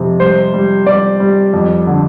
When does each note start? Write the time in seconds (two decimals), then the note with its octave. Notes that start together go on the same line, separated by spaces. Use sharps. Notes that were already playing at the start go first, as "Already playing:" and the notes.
Already playing: F2 C3
0.20 G3 C5
0.54 G3
0.86 G3 D5
1.20 G3
1.54 F2
1.87 D3